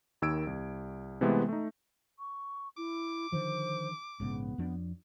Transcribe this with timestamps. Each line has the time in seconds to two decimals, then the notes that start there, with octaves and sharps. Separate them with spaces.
0.22 D#2 D#3 E6 G#6 D7
0.47 C2
1.21 C3 E3 G#3 A3 B3
1.48 A3 D#4
2.19 C#6
2.77 E4 D6
3.32 D3 D#3 F3 C5
4.20 A#1 G#2 C#3 B3
4.58 F2 F3 D4